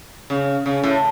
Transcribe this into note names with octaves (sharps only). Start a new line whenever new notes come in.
C#3
C#3
A2